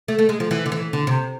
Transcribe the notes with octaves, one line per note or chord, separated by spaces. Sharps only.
A3
A3
G#3
F3
E3
D3
E3
D3
C3